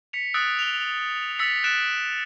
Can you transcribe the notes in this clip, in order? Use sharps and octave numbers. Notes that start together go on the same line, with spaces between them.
B6 C#7 F7
D#6 E6 F#6 A6 D7
F7 G7
E6 A6 B6 C#7
F#6 A6 D7 E7